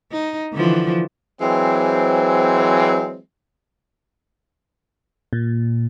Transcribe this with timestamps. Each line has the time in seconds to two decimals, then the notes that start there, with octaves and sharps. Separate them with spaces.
0.12 D#4
0.53 D3 E3 F3
1.40 E3 F#3 G#3 C4
5.33 A#2